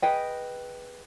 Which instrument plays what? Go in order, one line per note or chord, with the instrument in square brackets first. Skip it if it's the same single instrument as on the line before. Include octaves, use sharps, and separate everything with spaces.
[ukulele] G#4 B4 D#5 G5